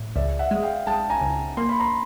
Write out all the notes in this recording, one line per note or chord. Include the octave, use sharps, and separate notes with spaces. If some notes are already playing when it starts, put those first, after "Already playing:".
Already playing: A2
C#2 D5 E5
E5 F#5
G#3
F5 G5
G#3 G5 A5
G#5 A#5
C#2
A#3 C6
B5
A#5 C6